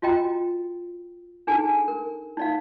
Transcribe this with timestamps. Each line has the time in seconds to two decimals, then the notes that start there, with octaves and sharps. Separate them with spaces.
0.02 F4 F#4 D#5 G5 A#5
1.47 D4 D#4 G#4 A4 G#5
1.88 A#4
2.37 D#4 D5 F5